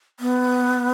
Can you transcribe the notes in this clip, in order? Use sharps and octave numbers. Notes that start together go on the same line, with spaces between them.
B3